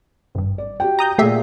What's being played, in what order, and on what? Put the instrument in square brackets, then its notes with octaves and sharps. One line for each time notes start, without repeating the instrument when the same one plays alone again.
[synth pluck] G#1 G2
[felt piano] D5
F#4 G4 G5
[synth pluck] A#5 D#6 G6
[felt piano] A#2 G#4 C7 [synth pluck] A3 G4 E5